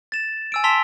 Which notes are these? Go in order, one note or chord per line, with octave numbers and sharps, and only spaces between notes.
A6 E7
G#5 E6 D7
A5 C6 E6 B6 F7 G7